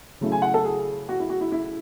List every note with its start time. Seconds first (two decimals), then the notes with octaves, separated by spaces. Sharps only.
0.21 C#3 F#3 A3 C#4 E4
0.32 G#5
0.42 F#5
0.54 A4
0.64 G#4
1.09 F#4
1.20 E4
1.30 F#4
1.40 E4
1.52 E4